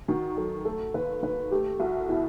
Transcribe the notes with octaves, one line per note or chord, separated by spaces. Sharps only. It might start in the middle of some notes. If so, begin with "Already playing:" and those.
D#3 F#4
F#3 A4
A3 A4
D#2 B4
D#3 B4
A3 G4
C2 F#4
B2 E4